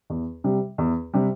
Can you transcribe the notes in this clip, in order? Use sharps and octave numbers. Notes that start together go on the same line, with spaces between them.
E2
C3 G3
E2
C3 G3